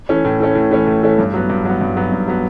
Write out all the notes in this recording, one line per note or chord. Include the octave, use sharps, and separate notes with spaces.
E3 A3 C#4
A2
E3 A3 C#4
A2
E3 A3 C#4
A2
E3 A3 C#4
G2
F#3 B3
G2
F#3 B3
G2
F#3 B3
G2
F#3 B3